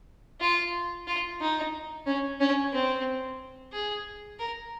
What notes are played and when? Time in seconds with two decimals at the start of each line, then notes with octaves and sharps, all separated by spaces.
0.41 F4
1.07 F4
1.41 D#4
2.06 C#4
2.40 C#4
2.73 C4
3.73 G#4
4.39 A#4